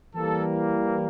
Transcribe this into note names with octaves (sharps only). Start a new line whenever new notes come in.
E3 G3 A#3 A4